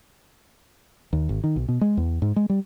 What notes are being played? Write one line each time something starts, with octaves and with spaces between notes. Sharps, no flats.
D#2
G#1
D#3
B1
B2
G#3
E2
G#2
G#3
G3